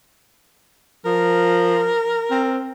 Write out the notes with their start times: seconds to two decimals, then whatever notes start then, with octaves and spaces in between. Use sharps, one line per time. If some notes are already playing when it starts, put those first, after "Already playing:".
1.05 F3 A#4
2.31 C4